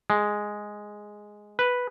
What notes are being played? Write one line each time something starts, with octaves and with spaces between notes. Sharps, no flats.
G#3
B4